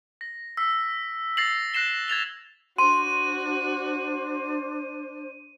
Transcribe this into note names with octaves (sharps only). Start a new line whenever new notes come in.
A#6
E6 B6
E6 A6 A#6 C7 F7 F#7
F#6 A#6 C7 E7 G7
G#6 A6 F7 G7
D4 F#4 C5 C6 D#7